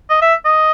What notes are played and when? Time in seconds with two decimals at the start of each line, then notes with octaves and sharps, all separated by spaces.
0.09 D#5
0.21 E5
0.45 D#5